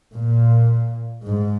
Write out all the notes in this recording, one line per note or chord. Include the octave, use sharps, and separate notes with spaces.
A#2
G#2